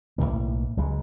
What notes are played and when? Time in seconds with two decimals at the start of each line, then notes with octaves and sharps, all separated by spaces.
0.18 B1 F#2 A2 A#3
0.77 C#2 C#3 F#3 G#3